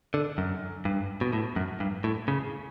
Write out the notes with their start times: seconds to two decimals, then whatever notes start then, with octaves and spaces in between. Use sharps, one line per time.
0.14 D3
0.38 F#2
0.85 G2
1.21 B2
1.33 A2
1.56 F#2
1.80 G2
2.04 A2
2.28 C#3